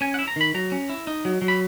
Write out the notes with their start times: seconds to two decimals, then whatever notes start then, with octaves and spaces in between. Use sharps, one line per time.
0.01 C#4 G#5
0.14 F#5
0.19 E4
0.28 A#5
0.36 D#3 B5
0.54 F#3 A#5
0.72 C#4
0.89 E4
1.07 D#4
1.25 F#3
1.42 F#3
1.48 B5